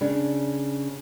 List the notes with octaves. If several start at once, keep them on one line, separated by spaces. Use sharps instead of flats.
C#3 D4